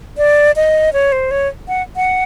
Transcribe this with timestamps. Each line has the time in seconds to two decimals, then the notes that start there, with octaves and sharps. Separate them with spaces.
0.18 D5
0.56 D#5
0.93 C#5
1.12 C5
1.31 C#5
1.68 F#5
1.96 F#5